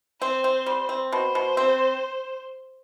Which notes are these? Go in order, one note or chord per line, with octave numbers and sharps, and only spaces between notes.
C4 C5
C4
G3
C4
B2 C5
B2
C4